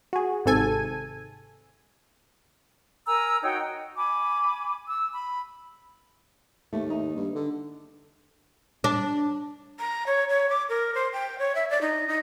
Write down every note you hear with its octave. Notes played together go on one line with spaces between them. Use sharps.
F#4 G#4
G#1 G#2 C3 A4 G#5 G#6
A#4 G#5 A#5 E6
D#4 F#4 C#5 G5
D#5
G#5 B5 D6
E6
B5
D#2 A3
D#4
G2
D3
D4
A#5
C#5
C#5
D6
A#4
C5
G5
C#5
E5
D5
D#4
D#4